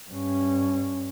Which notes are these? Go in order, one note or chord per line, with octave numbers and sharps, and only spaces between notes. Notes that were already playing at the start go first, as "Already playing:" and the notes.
G2 C#4